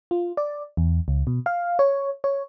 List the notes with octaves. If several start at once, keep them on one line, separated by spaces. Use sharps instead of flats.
F4
D5
E2
C#2
B2
F5
C#5
C#5